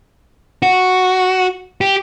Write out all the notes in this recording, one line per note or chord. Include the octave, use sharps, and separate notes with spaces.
F#4
G4